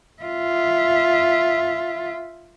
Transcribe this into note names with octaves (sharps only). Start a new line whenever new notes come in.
F4 E5